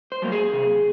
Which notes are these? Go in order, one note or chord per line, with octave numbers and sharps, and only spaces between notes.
C5
F#3 A#3
G#4
C3